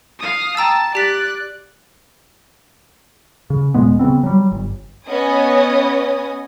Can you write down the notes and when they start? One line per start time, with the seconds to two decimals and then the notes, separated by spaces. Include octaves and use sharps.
0.19 F5 D#6
0.57 G5 A5 A#5 E6
0.95 G4 D5 F#6 B6
3.50 C#3
3.74 D#1 A#2 G#3 B3
3.99 C#3 F#3 B3 C4
4.23 F#3 G3
4.51 G1
5.07 B3 C#4 C#5 D#5 G#5 D#6